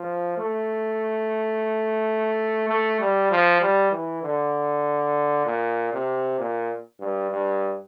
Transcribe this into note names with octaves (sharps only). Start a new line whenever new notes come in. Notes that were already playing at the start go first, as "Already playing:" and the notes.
Already playing: F3
A3
A3
G3
F3
G3
E3
D3
A#2
C3
A#2
G2
G2